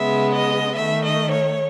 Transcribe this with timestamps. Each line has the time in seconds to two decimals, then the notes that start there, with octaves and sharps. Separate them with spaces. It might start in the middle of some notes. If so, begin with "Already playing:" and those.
Already playing: C#3 G#3 B3 E5
0.34 D#5
0.76 D#3 A3 E5
1.04 D#5
1.32 C#5